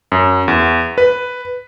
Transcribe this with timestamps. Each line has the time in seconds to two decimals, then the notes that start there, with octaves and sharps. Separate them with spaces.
0.12 F#2
0.48 E2
0.98 B4